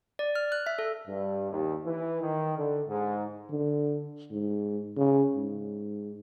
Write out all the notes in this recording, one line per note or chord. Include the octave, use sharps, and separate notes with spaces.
D5
F6
F#6
E5
A4
G2
D#2
E3
D#3
D3
G#2
D3
G#2
C#3
G#2